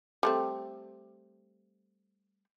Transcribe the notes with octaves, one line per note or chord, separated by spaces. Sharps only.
G3 A3 C4